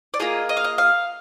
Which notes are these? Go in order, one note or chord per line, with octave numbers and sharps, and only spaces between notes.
D5
A#3 F4 G#4 D#5
D#5
F5
D#5
F5